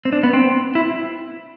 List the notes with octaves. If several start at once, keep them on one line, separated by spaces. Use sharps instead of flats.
C4
D4
B3
C4
E4